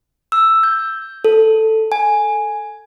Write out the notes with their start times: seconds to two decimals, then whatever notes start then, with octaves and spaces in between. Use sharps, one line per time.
0.32 E6
0.63 G6
1.25 A4
1.92 G#5